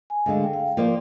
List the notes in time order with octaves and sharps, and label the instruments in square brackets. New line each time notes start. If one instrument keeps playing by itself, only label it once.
[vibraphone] G#5
[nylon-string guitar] D2 D3 G#3 [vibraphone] F5
[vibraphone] G5
F5
G5
[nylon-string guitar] F3 A#3 F4 C5 [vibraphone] D5